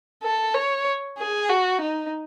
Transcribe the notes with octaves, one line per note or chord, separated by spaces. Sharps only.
A4
C#5
G#4
F#4
D#4